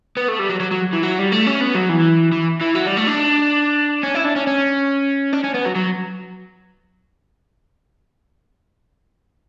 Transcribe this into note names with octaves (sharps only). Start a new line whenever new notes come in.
B3
A3
G3
F#3
F#3
F#3
E3
F#3
G3
A3
C#4
B3
F#3
E3
E3
E3
F#3
G3
A3
D4
C#4
E4
D4
C#4
C#4
D4
C#4
B3
F#3
F#3